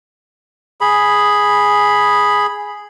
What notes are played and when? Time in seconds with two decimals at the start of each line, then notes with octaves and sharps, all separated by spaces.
0.81 G#4 B5